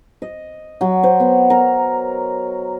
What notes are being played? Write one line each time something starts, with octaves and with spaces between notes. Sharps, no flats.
D#5
F#3
C5
B3
A#4